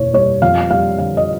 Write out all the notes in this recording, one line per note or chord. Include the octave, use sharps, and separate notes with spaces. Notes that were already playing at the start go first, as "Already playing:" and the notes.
Already playing: F#1 E2 B2 C#5
G3 C#5
F2 F5
G3 F5
D3 F5
D#5